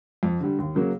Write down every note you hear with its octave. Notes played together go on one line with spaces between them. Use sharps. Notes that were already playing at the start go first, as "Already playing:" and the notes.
F2
D3 G3
D#2
C#3 F#3 A#3 C#4